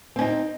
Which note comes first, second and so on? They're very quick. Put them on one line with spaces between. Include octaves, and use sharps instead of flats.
C4 C#4 D#4